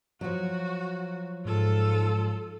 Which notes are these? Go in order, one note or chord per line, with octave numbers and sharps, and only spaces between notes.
F3 F#3 F#4
G#2 F4 A4